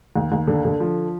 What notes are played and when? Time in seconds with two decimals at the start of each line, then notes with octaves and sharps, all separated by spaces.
0.16 D#2
0.32 D#2
0.48 D3
0.65 D3
0.80 F3